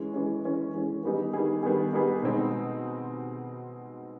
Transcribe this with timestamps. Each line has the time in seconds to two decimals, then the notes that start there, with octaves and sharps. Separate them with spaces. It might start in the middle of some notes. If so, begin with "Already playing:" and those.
Already playing: E3 G#3 C#4
0.14 E3 G#3 C#4
0.45 E3 G#3 C#4
0.74 E3 G#3 C#4
1.03 D#3 G3 B3 D#4 G#4
1.33 D#3 G3 B3 D#4 G#4
1.63 D#3 G3 B3 D#4 G#4
1.93 D#3 G3 B3 D#4 G#4
2.23 B2 G#3 C4 D#4